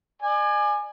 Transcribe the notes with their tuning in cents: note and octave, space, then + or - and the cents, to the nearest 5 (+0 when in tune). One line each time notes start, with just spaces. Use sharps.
D5 +35 G#5 +0